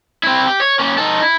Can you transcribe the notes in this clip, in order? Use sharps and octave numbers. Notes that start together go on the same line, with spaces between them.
C4 E4
G4
C#5
A#3 C#4
D#4 A4
E4